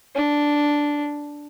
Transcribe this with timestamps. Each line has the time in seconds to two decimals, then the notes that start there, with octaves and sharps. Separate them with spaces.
0.15 D4